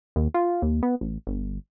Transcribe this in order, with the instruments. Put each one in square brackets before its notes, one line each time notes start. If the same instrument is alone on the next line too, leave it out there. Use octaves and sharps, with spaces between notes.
[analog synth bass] D#2
F4
D#2
B3
A1
G1